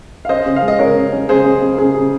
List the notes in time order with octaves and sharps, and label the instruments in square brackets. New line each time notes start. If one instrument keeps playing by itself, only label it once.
[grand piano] F5
C#4 C5 D#5
C#3
F5
G#3
D#5
C#3 A#4 C#5
C#3
C#4
C#3 G#4 C5
C#3
C#3
C#3 G#4
C#3